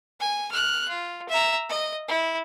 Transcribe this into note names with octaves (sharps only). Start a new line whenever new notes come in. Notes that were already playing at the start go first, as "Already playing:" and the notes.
G#5
F6 F#6
F4
E5 A#5
D#5
E4